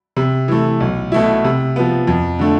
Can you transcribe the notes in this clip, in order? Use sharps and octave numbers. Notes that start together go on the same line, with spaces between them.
C3
E3 A3
B1
B2 A3 E4
C3
F3 B3
F2
D3 A3